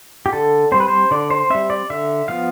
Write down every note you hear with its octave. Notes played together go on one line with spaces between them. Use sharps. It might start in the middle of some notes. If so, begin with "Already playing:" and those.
G4
D3 A4
G3 C4 C5
B4
C5
D3 D5
C5
G3 C4 E5
D5
D3 E5
F3 B3 F5